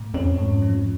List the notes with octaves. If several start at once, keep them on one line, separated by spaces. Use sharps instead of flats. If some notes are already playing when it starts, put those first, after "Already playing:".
Already playing: A2
F2 C#4
G#2
F3